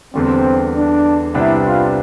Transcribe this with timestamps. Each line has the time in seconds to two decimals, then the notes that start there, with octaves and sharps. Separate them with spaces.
0.14 E2 D3 G3 C4
0.74 D4
1.34 C2 C3 G3 B3 D4 E4
1.65 F4